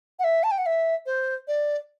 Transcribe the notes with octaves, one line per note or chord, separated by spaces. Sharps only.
F#5
E5
A5
G5
F#5
E5
C5
D5